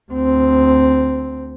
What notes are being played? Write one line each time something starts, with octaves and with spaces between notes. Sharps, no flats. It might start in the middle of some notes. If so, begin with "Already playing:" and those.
D2 C4